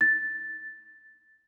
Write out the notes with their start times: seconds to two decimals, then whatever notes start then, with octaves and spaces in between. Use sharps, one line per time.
0.01 A6